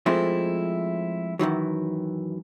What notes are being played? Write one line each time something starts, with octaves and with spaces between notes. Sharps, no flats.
F3 G#3 A3 C4 E4
F#2 D#3 E3 F#3